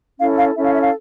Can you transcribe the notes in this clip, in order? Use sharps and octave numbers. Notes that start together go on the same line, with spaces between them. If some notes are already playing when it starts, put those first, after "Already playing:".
C#4 E4 A4 F5
F5
C#4 E4 A4 E5
F5
E5
F5